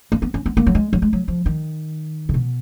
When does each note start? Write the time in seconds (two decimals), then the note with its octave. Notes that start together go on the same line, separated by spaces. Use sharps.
0.12 A#3
0.22 B3
0.34 C#4
0.46 B3
0.57 A#3
0.67 F#3
0.75 G#3
0.93 F#3
1.02 G#3
1.13 F#3
1.28 F3
1.46 D#3
2.29 C#3
2.34 B2